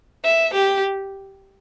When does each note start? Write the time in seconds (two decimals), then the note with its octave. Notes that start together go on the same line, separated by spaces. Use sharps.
0.24 E5
0.54 G4